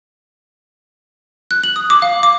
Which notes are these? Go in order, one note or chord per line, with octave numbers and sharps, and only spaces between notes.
F#6
F#7
D#6
D6
F5
D6